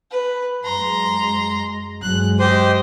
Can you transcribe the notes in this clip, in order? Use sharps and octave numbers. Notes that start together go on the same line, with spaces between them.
B4
F#2 G#3 A#5 C6
G1 F#3 G#3 F#6
G4 C5 D#5 C6